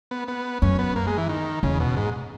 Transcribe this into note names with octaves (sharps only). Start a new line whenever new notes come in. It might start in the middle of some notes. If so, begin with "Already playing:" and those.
B3
B3
F#2 C#4
B3
A#3
G#3
E3
D#3
E2 C#3
B2
G#2